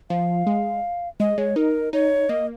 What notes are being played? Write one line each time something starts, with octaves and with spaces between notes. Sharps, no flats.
F3 F5
G#3
G#3 D#5
G#3 C#5
D#4 A#4
D#4 C#5
A#3 D#5